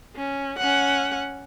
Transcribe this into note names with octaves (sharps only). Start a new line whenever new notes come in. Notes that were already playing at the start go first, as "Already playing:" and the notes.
C#4
C#4 F#5